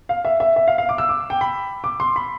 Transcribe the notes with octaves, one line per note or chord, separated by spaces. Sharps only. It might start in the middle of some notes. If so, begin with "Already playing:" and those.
F5
E5
E5
E5
F5
F5
D6
E6
D6
G5
B5
D6
C6
B5